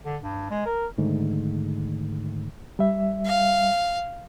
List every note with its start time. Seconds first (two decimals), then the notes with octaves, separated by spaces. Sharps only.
0.05 D3
0.22 G2
0.50 G#3
0.65 A#4
0.98 G#2 D3 D#3 A3
2.79 G3 E5
3.26 F5